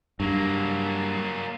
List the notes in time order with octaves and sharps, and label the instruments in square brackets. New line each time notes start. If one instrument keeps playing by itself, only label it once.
[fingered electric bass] G2 [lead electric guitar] F#3 A#3